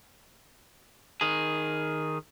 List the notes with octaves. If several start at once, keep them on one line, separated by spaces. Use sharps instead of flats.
D#3 G#4